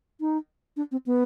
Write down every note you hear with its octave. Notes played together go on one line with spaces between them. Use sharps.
D#4
D4
C4
B3